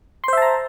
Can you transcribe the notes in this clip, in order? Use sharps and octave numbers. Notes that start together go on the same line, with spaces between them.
C5 E5 A5 A#5 C6